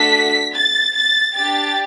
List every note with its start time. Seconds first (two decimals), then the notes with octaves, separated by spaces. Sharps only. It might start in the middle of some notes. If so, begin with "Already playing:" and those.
Already playing: A3 D4 F#4 A4 B6
0.54 A6
0.95 A6
1.36 D4 G4 A6